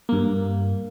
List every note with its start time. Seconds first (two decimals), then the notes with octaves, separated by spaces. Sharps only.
0.09 G2 A#3